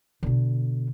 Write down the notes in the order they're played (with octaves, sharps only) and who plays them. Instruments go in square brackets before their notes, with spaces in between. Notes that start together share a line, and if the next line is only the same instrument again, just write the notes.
[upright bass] B2 D3